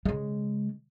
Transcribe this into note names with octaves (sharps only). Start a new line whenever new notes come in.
C#3 G#3